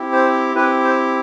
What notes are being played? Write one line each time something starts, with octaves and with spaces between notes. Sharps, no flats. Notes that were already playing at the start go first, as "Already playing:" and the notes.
Already playing: C4 E4 G4
C5
C4 E4 G4 B4
C5